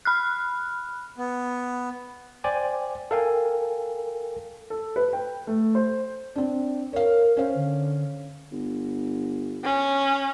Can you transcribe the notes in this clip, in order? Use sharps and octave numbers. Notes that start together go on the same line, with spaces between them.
B5 F6 F#6
B3
C5 D5 G5 G#5
A4 A#4 F5 G5 G#5
A4
B4
G5
A3
C5
C4 D4
A#4 C#5 F5
C#4 C5 F5
D3
G1
C#4